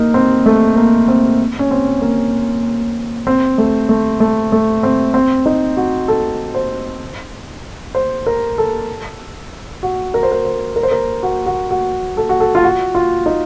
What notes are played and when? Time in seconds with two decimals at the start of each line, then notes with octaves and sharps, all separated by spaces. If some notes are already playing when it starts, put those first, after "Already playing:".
Already playing: A#3 D#4
0.14 C4
0.46 A3
0.76 A#3
1.08 C4
1.59 C#4
1.71 C4
2.02 A#3
3.27 C4
3.58 A3
3.89 A3
4.20 A3
4.52 A3
4.83 C4
5.14 C4
5.46 D#4
5.77 F#4
6.08 A4
6.55 C5
7.95 C5
8.27 A#4
8.58 A4
9.83 F#4
10.14 A#4
10.23 C5
10.32 A#4
10.45 C5
10.76 A#4
10.83 C5
10.91 A#4
11.23 F#4
11.46 F#4
11.70 F#4
12.17 A4
12.29 F#4
12.40 A4
12.55 F4
12.64 F#4
12.95 F4
13.26 D#4